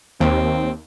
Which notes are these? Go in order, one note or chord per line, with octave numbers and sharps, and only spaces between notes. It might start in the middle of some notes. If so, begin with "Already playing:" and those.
D#2 C4